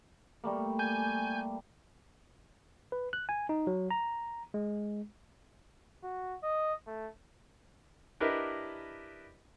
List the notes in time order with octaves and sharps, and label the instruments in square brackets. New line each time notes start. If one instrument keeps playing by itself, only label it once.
[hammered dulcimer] G3 A3 A#3
[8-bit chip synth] G#5 G6
[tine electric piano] B4
F#6
G#5
D#4
F#3
A#5
G#3
[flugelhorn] F#4
D#5
A3
[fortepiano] D4 E4 G4 A#4 B4 D#5